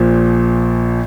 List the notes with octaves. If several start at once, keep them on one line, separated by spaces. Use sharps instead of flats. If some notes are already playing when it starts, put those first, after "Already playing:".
Already playing: A#1 A#2 F3